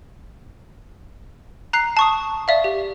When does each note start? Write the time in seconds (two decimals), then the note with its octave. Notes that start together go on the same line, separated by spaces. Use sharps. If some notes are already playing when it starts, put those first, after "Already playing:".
1.73 A#5 F#6 C7
1.97 A5 C#6 D#6
2.48 D5 E5 F5
2.64 G4